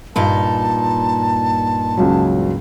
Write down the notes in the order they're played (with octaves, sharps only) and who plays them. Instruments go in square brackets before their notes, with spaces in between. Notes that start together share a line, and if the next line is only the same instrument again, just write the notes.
[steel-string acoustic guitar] G2 A#2 D#4 [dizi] A5
[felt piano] C#2 F#3